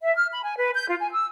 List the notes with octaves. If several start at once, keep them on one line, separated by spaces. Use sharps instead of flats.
E5
F6
B5
G#5
B4
G6
F4
G#5
E6